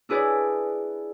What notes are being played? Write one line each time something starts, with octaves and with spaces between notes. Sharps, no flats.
D4 E4 G#4 B4 D5